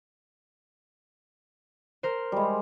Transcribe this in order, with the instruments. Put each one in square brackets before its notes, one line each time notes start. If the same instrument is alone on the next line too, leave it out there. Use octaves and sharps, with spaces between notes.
[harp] A#4 C5
[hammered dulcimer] G3 G#3